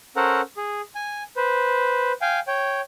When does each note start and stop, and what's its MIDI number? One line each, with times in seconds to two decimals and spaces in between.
0.16 0.41 61
0.16 0.41 69
0.16 0.41 70
0.16 0.41 72
0.16 0.41 78
0.16 0.41 82
0.57 0.81 68
0.95 1.23 80
1.36 2.12 71
1.36 2.12 72
2.21 2.40 77
2.21 2.40 79
2.21 2.40 80
2.47 2.81 73
2.47 2.81 79